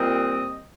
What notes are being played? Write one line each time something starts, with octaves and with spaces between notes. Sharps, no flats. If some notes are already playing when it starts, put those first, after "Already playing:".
Already playing: A#2 G3 C4 D#5